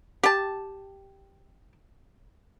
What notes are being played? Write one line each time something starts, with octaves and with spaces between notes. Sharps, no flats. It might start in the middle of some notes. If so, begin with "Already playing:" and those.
G4 A5